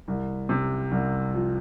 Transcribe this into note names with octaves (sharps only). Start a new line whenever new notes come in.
C2
C3
C2
F3